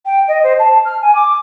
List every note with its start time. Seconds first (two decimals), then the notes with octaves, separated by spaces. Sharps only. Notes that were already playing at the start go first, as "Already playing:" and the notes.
0.05 G5
0.27 D#5
0.43 C5
0.59 A5
0.85 F6
1.01 G#5
1.15 D6